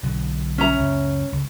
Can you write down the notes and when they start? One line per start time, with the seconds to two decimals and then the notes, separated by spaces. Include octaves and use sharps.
0.03 B1 B2 D3
0.58 C#4 E5 A#5
0.79 C#2 F#2
1.32 C#2